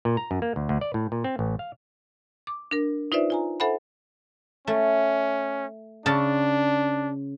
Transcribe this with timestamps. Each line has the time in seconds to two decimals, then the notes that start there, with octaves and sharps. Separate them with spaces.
0.05 A#2
0.17 A#5
0.31 F#2
0.42 A#3
0.56 D2
0.69 D2
0.81 D5
0.94 A2
1.12 A#2
1.24 C4
1.39 A1
1.59 F5
2.47 D6
2.71 D4 A#4
3.12 D#4 F4 B4 C5 D5 E5
3.30 F4 G#5 A#5
3.60 A4 C5 E5 F#5 G#5 B5
4.67 A3 C#4
6.06 C#3 D4 A5